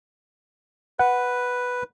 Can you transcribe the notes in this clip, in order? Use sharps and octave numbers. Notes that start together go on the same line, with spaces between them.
B4 F#5